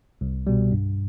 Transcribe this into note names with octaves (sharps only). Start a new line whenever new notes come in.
C2
B2 G3
G2